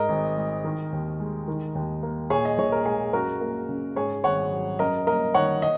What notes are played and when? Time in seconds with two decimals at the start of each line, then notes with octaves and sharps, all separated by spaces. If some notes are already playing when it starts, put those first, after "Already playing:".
Already playing: G#2 A#4 D#5
0.09 G#1
0.37 G#3
0.65 D#3
0.92 D#2
1.20 G#3
1.48 D#3
1.75 D#2
2.03 A#3
2.30 A#2 G#4 C#5
2.45 D#5
2.58 A#1 C#5
2.72 A#4
2.86 G#3 G#4
3.13 F#2 F#4 A#4
3.41 A#3
3.69 C#3
3.96 G#2 G#4 C#5
4.24 G#1 C#5 F#5
4.52 F#3
4.79 F#2 A#4 D#5
5.07 A#3 A#4 D#5
5.34 D#3 C#5 F#5
5.62 D#5